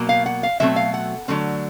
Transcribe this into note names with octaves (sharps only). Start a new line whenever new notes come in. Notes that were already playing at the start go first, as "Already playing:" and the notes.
Already playing: B2 F#3 A#3
F5
F#5
F5
B2 F#3 A3 C4 E5
F5
F#5
D3 F#3 A3 C4